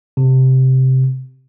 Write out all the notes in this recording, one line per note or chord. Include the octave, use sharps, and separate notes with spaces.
C3